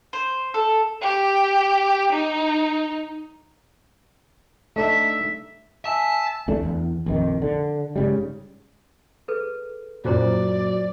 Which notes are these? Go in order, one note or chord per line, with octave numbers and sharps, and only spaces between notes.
C5
A4
G4
D#4
A3 D4 D#4 E5
E5 G#5 A5
E2 A3 D4
E2
A#1 F2 D#3
D3
G#2 C#3 G3
G#4 A4 B4
F#2 A#2 F#3 F4 C5 D5 A#5